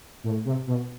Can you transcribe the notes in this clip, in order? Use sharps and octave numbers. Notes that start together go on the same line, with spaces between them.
A2
C3
B2